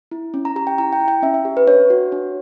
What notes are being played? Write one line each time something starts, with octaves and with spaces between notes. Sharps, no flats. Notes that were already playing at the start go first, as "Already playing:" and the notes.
E4
C#4
A#5
G4 A#5
G5
E4 A#5
G5
E4
G5
C#4 E5
E5
G4
B4
D4 C#5
F#4
D4